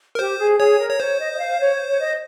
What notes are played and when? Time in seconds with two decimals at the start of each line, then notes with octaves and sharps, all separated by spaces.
0.15 A#4
0.19 G4 C5
0.39 G#4
0.59 G#4 C#5
0.79 A#4
0.89 C#5
0.99 C5 C#5
1.19 D#5
1.33 D#5
1.39 F5
1.59 C#5
1.88 C#5
1.99 D#5